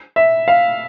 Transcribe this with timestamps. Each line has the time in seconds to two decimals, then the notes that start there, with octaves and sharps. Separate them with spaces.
0.16 E5
0.48 F5